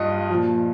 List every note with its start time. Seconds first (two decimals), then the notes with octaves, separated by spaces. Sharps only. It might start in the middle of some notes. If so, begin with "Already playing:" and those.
Already playing: G2 F4 D#5
0.30 A#2 F3